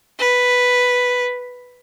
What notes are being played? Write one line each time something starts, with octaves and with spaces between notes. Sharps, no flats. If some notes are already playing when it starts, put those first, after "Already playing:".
B4